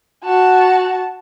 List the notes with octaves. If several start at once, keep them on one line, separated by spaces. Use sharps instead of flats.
F#4 A5